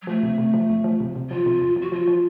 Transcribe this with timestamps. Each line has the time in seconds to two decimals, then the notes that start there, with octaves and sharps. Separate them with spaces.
0.02 F#3
0.07 F3 A3
0.23 C3
0.38 C3
0.54 F3
0.69 F2
0.84 F3
1.00 C3
1.16 C3
1.30 F3 F4
1.46 C3
1.62 F2
1.76 F3
1.82 F#4
1.92 F3 F4
2.08 F3